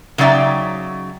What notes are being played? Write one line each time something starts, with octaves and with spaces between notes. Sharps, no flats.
C#3 F#3 D#4 D5 E5 G5